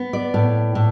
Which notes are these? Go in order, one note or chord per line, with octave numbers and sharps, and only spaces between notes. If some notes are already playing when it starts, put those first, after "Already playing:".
Already playing: B3
D5
A2
A2